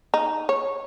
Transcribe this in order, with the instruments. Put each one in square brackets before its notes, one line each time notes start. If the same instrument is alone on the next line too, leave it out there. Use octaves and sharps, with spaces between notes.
[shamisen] D#4
C#5